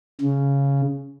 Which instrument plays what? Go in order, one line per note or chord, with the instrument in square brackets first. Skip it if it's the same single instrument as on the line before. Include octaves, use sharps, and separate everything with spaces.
[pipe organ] C#3